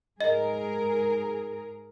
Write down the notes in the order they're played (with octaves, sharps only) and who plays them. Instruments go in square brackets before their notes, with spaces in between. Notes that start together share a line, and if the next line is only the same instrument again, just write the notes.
[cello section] G#2 G#4 A#4 [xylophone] D#5